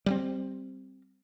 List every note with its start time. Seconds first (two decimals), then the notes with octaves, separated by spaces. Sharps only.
0.06 G3 G#3 C4